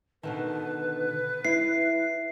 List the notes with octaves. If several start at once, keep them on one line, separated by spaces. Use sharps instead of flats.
B2 D3 D#3 B4
E4 C7